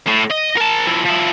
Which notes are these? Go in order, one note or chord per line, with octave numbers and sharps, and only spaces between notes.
A2
D#5
A#4 A5
F3 E4
F3 E4